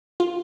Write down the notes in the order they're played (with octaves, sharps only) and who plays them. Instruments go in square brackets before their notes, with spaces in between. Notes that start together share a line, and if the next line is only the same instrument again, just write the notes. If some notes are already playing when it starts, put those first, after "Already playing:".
[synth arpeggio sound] F4